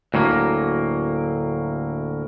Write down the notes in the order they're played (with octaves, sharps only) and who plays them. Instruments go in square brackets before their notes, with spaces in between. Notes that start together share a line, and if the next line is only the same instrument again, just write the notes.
[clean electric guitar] D2 A2 F#3 A#3